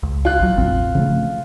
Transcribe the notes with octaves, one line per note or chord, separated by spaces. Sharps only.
C#2
F4 F#6
G#1 F#3
E1 A1 C4
C#3 F3 A3